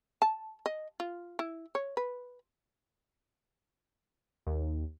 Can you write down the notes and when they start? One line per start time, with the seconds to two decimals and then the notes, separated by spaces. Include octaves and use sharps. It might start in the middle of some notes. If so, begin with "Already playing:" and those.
0.22 A5
0.66 D#5
1.00 F4
1.39 E4
1.75 C#5
1.97 B4
4.47 D#2